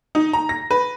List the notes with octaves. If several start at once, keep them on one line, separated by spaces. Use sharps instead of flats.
D#4
A#5
A#6
B4